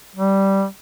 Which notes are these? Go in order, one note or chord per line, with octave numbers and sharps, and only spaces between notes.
G3